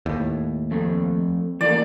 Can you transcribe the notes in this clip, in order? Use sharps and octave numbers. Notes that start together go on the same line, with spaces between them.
D#2 A2
F2 A3
E3 A3 A#3 D5